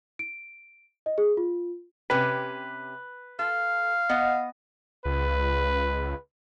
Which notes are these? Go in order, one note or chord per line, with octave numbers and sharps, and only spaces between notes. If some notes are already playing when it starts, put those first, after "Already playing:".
D7
D#5
G#4
F4
C3 C#4 G4 B4
A4 F5
B3 D#5 F#5
C#2 B4